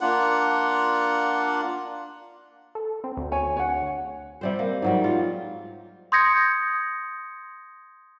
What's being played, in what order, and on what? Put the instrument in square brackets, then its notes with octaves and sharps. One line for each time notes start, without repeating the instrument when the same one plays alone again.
[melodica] A#3 D4 F4 F#5
[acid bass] A4
C4
D2
[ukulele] C#5 G#5
C#5 F#5
[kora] C3 G3 C5
A#3
G#2 F#3 G3
F4
[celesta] C6 D#6 G6 G#6 A#6 C#7